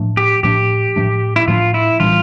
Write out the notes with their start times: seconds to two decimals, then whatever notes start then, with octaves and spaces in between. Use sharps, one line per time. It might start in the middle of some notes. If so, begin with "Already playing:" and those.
Already playing: A2 F3 A3 D4
0.17 G4
0.43 A2 F3 A3 D4 G4
0.96 A2 F3 A3 D4
1.36 E4
1.48 A2 F3 A3 D4 F4
1.74 E4
2.00 A2 E3 G3 D4 F4